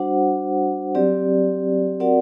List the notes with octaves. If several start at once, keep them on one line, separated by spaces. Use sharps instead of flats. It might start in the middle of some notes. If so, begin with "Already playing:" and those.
Already playing: G3 D4 F#4 C5 F#5
F#3 C4 G4 D5
C4 F#4 A#4 D5 F#5